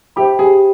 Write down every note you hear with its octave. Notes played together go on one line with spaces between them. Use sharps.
G4 C5 E5 G5 B5
G4 G#4